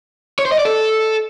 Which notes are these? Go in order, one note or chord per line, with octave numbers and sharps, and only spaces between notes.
C#5
C5
D#5
D5
A4